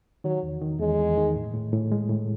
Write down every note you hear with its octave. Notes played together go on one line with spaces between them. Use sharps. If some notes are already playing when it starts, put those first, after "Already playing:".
D#3 F#3
E2
D#3
E2 G#3
E2
D#3
A2
A2
A2
G#3
A2